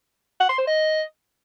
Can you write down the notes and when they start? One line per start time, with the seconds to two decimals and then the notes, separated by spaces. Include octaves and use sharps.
0.40 F#5
0.49 C6
0.58 C5
0.67 D#5